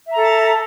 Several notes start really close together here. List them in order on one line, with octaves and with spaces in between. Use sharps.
E5 A#5 A4 A5